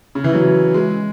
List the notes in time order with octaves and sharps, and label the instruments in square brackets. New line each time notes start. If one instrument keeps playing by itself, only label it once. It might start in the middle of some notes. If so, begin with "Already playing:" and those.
[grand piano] C#3
E3
F#3
G#3